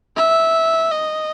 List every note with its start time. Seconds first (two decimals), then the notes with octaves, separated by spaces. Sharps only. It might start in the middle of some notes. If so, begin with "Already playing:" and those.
0.16 E5
0.91 D#5